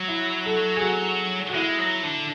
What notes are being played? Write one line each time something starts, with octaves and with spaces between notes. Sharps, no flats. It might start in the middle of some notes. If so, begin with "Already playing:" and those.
Already playing: F#3
E4
A4
G#4
F#4
F#4
G#3 E4
F#3
D3